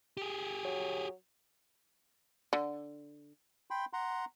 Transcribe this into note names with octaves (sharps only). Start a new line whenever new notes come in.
G4 G#4
F#3
D3
G5 B5 C6
F#5 A#5 C6